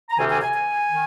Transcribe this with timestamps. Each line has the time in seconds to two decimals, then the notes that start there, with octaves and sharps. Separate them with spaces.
0.09 A#5
0.18 D2 C3 D#3 G3 C4 G#5
0.29 G#5
0.42 G#5
0.53 G#5
0.90 D#3